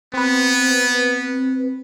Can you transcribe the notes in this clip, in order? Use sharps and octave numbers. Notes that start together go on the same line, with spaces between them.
B3 C4 B4